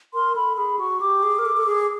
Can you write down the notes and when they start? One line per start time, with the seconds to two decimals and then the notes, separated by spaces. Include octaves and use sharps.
0.14 A#4 C6
0.35 A4 B5
0.57 G#4 B5
0.79 F#4 C#6
1.01 G4 D6
1.23 G#4
1.39 A#4
1.45 A4
1.57 A4
1.66 G#4